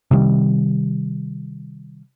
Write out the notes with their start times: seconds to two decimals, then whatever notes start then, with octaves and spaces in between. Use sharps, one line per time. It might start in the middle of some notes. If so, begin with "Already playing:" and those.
0.11 C3 D#3 G3